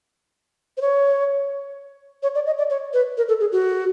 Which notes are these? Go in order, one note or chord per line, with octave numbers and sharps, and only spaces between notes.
C5
C#5
C#5
D5
D#5
D5
C#5
B4
A#4
A4
G#4
F#4